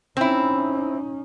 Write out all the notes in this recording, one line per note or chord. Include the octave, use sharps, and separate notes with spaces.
C4 C#4 D#4 E4